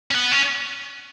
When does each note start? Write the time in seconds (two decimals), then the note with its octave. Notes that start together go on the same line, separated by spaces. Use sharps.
0.11 C#4
0.15 B3
0.32 C#4